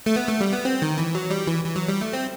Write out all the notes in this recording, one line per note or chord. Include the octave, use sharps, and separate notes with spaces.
A3
B3
A3
G3
B3
C4
D#3
E3
F#3
G3
E3
E3
F#3
G3
A3
C4